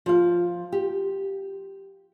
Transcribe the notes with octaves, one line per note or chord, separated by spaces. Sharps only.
F3 F5
G4